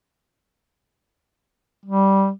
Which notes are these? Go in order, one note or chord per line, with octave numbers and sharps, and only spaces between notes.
G3